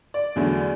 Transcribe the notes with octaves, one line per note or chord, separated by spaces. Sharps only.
D5
E2 D3 F#3 A3